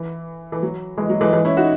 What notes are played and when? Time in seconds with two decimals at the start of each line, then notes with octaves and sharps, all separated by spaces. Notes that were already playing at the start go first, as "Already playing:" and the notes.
Already playing: E3
0.52 E3
0.63 F#3
0.97 E3 G#3
1.09 F#3
1.21 E3 G#3
1.33 E3 G#3
1.45 C#4 E4
1.57 D#4 F#4